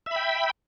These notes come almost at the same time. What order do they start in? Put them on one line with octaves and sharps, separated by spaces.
E5 B5 G5